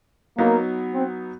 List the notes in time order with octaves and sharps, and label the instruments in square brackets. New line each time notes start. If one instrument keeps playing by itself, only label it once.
[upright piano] F#3 B3 D#4 [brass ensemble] A#3
[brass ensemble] C4